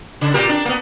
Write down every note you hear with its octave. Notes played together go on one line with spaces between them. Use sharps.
C#3
A#2 G4 A#4
D4
A#3 B3